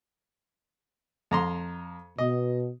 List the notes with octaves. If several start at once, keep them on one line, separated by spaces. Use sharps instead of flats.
F2 A#5 C6
B2 D#5